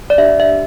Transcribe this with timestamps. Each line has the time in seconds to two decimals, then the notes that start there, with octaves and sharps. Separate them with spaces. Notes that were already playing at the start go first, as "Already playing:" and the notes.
0.10 D5
0.18 D4 G4 E5
0.40 E5